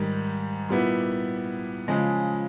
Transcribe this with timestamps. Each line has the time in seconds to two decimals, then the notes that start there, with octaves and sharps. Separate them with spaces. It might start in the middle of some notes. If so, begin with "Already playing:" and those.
Already playing: G#2 D#3 G3
0.69 A#2 G3 B3 E4
1.88 C#3 F3 G#3